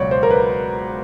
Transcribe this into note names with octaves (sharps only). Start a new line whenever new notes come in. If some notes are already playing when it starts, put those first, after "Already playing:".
Already playing: C#2 B2 F#3 C#5 D5
C5
A#4
B4